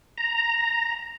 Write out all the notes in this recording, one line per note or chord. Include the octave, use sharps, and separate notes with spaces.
A#5